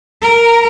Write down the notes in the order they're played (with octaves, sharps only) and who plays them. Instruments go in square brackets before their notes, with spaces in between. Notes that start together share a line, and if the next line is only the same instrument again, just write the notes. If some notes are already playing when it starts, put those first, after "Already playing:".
[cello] A#4